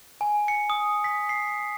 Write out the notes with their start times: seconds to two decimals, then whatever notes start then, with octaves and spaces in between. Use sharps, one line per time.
0.21 G#5
0.48 C#7
0.70 D#6
1.04 B6
1.29 C7